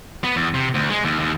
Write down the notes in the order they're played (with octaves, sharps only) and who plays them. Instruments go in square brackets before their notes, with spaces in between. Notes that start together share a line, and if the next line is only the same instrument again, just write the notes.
[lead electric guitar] B3
E2
C3
D2
G#3
D#2
D#2